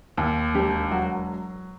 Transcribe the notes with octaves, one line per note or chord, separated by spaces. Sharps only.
D#2
E1 G4
F#3 F#4